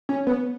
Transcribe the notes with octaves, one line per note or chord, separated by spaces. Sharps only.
C#4
B3